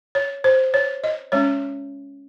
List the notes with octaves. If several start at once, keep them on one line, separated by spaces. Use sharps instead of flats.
C#5
C5
C#5
D#5
G#3 C#4 C#5